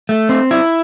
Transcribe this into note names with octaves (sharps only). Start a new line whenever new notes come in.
A3
C4
E4